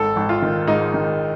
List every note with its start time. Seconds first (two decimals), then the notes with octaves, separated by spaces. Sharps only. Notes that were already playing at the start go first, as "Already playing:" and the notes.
Already playing: G#1 A4
0.16 G#1
0.29 F4
0.42 D#3
0.67 G#2 D#4
0.94 D#3